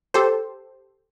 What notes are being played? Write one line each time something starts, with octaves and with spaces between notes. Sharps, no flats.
G4 A4 C5